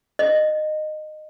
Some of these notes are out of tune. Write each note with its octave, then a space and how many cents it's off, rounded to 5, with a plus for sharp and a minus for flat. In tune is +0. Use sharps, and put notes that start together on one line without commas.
D#5 -20